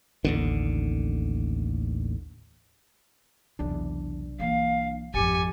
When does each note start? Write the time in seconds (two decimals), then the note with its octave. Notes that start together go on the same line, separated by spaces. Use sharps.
0.25 A1 D#2 D3
3.59 B1 E2 C3 D4
4.40 E3 A#3 F5
5.14 G#1 F2 G4 G#5 A6 C#7